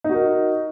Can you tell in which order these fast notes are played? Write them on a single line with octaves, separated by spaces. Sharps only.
D#4 F#4 A#4